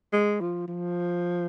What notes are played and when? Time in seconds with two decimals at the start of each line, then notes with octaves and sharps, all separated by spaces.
0.13 G#3
0.41 F3
0.68 F3